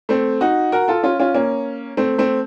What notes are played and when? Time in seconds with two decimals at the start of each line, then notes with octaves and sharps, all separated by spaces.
0.09 A3 C4
0.41 D#4 F#4
0.72 F#4 A#4
0.88 F4 A4
1.03 C#4 F4
1.20 C#4 F4
1.35 A#3 C#4
1.97 A3 C4
2.18 A3 C4